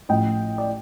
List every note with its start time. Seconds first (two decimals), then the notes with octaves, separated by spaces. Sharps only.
0.09 A1 A2 F3 D#5 G5
0.58 D5